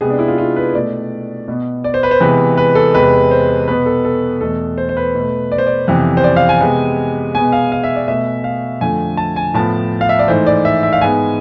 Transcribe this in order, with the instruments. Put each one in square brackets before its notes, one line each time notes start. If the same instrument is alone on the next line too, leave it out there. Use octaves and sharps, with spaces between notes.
[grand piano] C3 G#3 B3 G#4
D4
E4
F4
F4
B4
B2 A3 D5
B2 B3
D5
C5
B4
C5
C3 E3 G#3 B3 B4
B4
A4
E2 C3 G#3 B4
C5
B2 B3 B4
A4
A4
E2 B2 A3 A4
C5
C5
B4
B2 A3
D5
C5
D5
F2 C3 E3 B3
C5
D5
F5
G#5
C3 G#3 B3
B2 G#3 B3 G#5
F5
F5
E5
D5
B2 A3 E5
F5
F2 D3 F3 A3 G#5
A5
G#5
A2 F3 B3 A5
F5
E5
D5
G#2 E3 A3 C5
D5
E5
E5
F5
G#2 G#3 B3 G#5